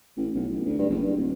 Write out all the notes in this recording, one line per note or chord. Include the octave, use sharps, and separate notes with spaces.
A1
B1
A1
D2
G2
F#1
G2
D#1